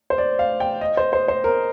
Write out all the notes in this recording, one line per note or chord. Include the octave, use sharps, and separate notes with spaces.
C5
D5
F5
G5
D#5
C5
C5
C5
A#4